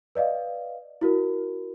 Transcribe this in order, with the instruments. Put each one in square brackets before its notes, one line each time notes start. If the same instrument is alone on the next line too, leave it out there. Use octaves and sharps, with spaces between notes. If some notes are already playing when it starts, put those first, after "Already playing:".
[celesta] B4 D5 D#5 F5
E4 F#4 A#4